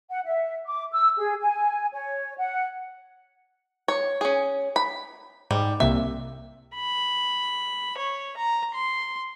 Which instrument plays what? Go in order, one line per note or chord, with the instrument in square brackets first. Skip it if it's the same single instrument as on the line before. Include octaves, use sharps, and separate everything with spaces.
[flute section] F#5
E5
D6
E6
G#4
G#5
C#5
F#5
[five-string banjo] C#5
C#4 G#4
B5
[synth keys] G#2 [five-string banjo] G3
[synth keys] C2 C3 A#3 [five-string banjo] E5
[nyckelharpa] B5
C#5
A#5
C6